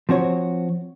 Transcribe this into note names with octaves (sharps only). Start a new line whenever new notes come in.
F3 C4 F#4 C#5